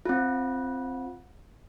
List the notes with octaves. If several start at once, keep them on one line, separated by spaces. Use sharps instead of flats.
C4 F4